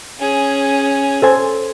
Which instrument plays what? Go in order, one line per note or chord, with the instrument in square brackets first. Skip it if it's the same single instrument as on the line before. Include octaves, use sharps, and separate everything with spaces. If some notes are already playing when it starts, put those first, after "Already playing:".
[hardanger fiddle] C#4 G#4
[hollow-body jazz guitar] A4 C5 G#5